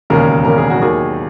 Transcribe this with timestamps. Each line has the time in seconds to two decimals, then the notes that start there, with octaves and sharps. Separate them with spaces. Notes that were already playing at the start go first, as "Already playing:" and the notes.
0.10 E1 D#2 C#3 A#4
0.45 E1 D#2 C#3 A#4
0.58 G#4
0.70 F#4
0.80 D#2 D#3 F#3 G#4